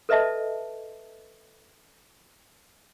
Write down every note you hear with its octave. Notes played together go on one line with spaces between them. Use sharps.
A4 B4 D#5 E5 A5